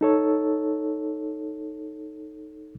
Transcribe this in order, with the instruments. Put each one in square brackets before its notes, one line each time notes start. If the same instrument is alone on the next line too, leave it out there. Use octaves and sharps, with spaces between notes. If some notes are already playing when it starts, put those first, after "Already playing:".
[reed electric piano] D#4 A4 C#5